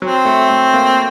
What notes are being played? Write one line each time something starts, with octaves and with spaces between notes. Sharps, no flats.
F#3 C4
A3
A3
A#3